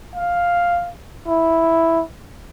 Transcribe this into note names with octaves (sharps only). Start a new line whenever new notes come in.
F5
E4